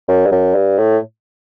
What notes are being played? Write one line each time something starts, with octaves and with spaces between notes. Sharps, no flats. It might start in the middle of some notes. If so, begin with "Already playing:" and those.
F#2
G2
F#2
G2
A2